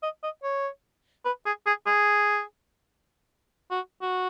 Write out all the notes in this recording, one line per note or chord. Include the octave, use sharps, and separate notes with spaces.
D#5
D#5
C#5
B4
G#4
G#4
G#4
F#4
F#4